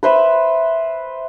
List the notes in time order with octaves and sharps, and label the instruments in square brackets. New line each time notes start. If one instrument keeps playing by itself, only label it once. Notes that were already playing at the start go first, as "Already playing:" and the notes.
[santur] B4 C5 E5 B5